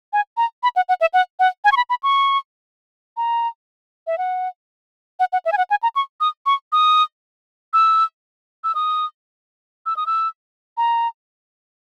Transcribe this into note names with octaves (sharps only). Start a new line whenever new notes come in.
G#5
A#5
B5
F#5
F#5
E5
F#5
F#5
G#5
C#6
B5
B5
C#6
A#5
E5
F#5
F#5
F#5
E5
G#5
F#5
G#5
A#5
C#6
D#6
C#6
D#6
E6
E6
D#6
E6
D#6
E6
A#5